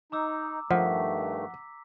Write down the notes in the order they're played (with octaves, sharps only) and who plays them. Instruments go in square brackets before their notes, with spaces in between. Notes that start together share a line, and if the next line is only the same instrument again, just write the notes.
[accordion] D#4 [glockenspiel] A#5 D6 E6
[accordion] G2 D#3 A3 [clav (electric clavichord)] F3 [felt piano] F#5 [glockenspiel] B6